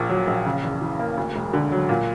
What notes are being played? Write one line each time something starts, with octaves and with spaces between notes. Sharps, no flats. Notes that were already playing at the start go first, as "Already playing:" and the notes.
Already playing: A#1 A#2
F#3
A#1
C#3
E2
E3
A#3
D2
E1
D3
F#3
A#2